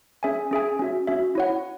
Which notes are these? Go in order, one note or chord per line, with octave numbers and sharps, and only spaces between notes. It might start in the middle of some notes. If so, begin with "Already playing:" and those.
C#4 G#4 E5 G#5
C#4 G#4 E5 G#5
C#4 F#4 E5
C#4 F#4 E5
E4 C#5 F#5